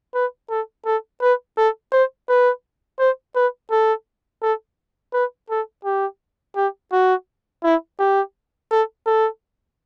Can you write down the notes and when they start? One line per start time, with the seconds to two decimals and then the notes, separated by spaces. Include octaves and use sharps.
0.14 B4
0.50 A4
0.86 A4
1.22 B4
1.58 A4
1.92 C5
2.29 B4
2.99 C5
3.36 B4
3.71 A4
4.42 A4
5.13 B4
5.50 A4
5.85 G4
6.56 G4
6.92 F#4
7.64 E4
7.99 G4
8.71 A4
9.06 A4